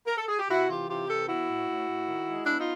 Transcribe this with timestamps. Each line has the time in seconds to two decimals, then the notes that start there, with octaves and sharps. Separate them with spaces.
0.07 A#4
0.17 A4
0.28 G#4
0.39 G4
0.50 C3 E4 F#4
0.69 E3 F4 G4
0.89 C3 F4 G4
1.08 E3 G4 A4
1.28 B3 E4 F#4
1.48 A2
1.68 A2
1.88 A2
2.08 D#3
2.27 G#3
2.46 B3 D4 E4
2.60 D#4 F4